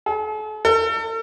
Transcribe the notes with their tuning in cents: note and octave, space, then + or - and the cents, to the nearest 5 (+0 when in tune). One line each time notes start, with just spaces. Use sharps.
A4 -45
A4 +40